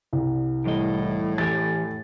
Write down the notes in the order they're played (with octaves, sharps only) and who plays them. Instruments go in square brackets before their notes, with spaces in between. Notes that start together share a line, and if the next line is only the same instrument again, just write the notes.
[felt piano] C2
[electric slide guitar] E2 G3 D#5 [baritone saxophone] A2
[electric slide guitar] E3 G4 G#5 [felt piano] A6